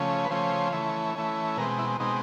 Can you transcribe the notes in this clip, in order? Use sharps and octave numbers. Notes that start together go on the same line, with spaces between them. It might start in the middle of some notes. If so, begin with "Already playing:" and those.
Already playing: C#3 F3 A3 C#4
B4
C#3 F3 A3 C#4 C5
E3 A3 C#4
E3 A3 C#4
B2 G#3 C4 A#4
E4
B2 G#3 C4 D#4